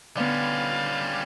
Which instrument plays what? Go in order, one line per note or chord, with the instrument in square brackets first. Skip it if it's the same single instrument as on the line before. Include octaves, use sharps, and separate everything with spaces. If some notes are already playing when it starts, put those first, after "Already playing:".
[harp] D3 B3 [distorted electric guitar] G3 C#4 [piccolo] F5